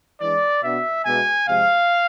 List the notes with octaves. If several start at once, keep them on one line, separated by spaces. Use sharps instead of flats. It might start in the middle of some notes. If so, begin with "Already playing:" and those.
E3 G#3 D4 D5
B2 B3 D4 E5
B2 G#3 B3 D4 G#5
C3 F3 G#3 F5